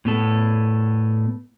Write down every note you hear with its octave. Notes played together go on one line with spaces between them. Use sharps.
A2 B3 A4